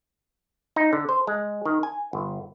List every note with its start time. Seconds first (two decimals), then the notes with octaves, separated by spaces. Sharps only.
0.76 D#4
0.93 D3
1.09 C5
1.27 G#3
1.65 D#3
1.83 G#5
2.13 G1